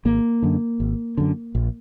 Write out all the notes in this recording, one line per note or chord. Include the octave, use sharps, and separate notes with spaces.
G#1 A#3
F#2 D3
G#1
F#2 D3
A#1